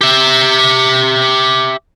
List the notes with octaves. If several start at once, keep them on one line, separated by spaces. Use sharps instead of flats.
G4 E5